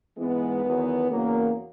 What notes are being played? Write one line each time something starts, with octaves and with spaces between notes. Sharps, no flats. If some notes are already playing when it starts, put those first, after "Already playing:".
G#2 E3 G#3 B3
E2 D#3 F#3
E2 C#3 F#3 A#3